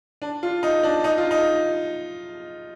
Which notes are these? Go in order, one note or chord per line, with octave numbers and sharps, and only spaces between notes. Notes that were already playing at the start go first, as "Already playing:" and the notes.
D4
F4
D#4
D4
D#4
F4
D#4